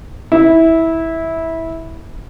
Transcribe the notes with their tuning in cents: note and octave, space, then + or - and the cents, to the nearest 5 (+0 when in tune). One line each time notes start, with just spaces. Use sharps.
E4 -15